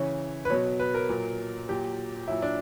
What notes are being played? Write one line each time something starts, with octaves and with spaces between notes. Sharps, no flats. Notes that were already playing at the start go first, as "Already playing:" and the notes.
Already playing: C#3 E3 C#5
B4
B2 F#3 C#5
B4
A#4
A#2 F#3
A#2 F#3 G4
A#2 F#3 E4
D4